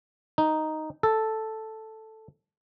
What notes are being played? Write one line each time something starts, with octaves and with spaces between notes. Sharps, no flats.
D#4
A4